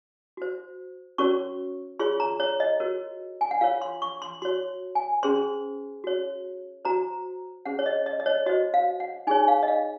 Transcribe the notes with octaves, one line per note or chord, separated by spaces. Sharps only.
F#4 C5
C#4 F#4 A#4 C#5 C#6
F4 G#4 C#5 C6
A#5
C#5
D#5
F#4 A#4 C#5
G#5
F#5
F4 A#4 C#5 F5
C6
C#6
C6
F#4 C#5 C6
G#5
C#4 G#4 C5 C6
F#4 C#5
F#4 C5 A#5
C#4 G#4 C5 F#5
C#5
D#5
D#5
D#5
C#5
F#4 C5 D#5
F5
F#5
D#4 G#4 C#5 G#5
F5
D#5
F5